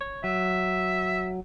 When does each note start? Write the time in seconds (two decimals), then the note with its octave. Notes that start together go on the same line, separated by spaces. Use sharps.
0.01 C#5
0.24 F#3 E5